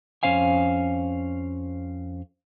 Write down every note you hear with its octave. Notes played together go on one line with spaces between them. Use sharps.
F2 G#2 C#4 C5 F5 G#5